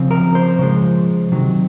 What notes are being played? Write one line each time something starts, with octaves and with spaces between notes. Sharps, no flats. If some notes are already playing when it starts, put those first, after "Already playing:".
Already playing: C#3 F3 C4
A#4
C5
C#3 F3 G#3
C3 D#3 F#3